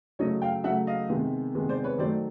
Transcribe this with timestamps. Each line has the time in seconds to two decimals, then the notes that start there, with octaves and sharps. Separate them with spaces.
0.19 C#3 F#3 A3 C#5 D#5
0.42 F5 G5
0.64 C#3 F#3 A3 E5 F#5
0.87 D#5 F5
1.09 C3 D#3 G#3 B3
1.55 C3 D#3 G#3 B3
1.69 C5 D5
1.84 B4 C#5
1.98 D#3 F#3 A3 C5 D5